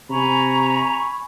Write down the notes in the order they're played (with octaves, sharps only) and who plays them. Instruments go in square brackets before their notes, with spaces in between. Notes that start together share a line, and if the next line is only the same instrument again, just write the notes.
[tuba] C3 [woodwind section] G#5 B5 C#6 [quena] A#5